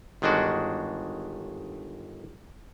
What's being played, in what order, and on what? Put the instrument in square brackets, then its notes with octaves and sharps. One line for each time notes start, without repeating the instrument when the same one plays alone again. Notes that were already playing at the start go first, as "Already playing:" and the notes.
[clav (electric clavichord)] G1 D#3 G#3 D4 F#4